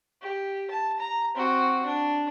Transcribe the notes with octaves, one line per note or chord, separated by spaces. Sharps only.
G4
A5
A#5
C4 F#4
D4